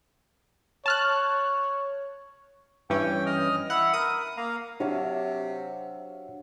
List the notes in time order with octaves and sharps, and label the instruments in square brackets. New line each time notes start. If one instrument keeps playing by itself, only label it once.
[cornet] C#5 [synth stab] A5 F6 F#6
[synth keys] G2 E3 C#4 [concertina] G5
[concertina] D#5 D#6 F6
[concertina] E4 E5 [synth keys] F#5
[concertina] A#4 [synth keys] D#6
[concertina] A#3 F5 A#5
[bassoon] C3 [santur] F#3 E5 F5 [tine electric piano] D4 C#5